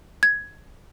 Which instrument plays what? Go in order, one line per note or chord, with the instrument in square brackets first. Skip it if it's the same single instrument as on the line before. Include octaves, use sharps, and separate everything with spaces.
[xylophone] G#6